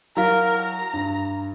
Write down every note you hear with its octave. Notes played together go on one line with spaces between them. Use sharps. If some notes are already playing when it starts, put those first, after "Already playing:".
F#3 E4 A#4 F5
A#5
G2